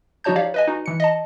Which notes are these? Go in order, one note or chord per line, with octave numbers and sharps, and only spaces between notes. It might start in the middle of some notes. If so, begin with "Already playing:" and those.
F3 D#4 F#4 C#5 A5 G6
G4 C#5 D5 F5
B4 D#5 G#5
D#4 F#4
E3 C#7
D#5 A5